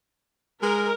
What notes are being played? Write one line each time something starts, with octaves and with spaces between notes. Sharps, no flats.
G#3 A#4